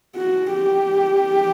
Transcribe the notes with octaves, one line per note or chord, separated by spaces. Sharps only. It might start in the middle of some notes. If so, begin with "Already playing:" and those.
F#4
G4